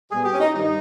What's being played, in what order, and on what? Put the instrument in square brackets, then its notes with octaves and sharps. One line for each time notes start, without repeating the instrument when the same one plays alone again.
[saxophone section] A#2 G3 B3 G#4
G4
C#4
D#4
G2 D#3 G3 D#4